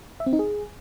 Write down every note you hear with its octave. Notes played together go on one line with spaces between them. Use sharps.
E5
C4
D#4
G#4